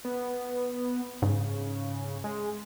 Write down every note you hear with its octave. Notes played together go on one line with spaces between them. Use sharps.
B3
G#2 C#3
G#3